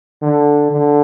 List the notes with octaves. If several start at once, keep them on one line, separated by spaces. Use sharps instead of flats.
D3
D3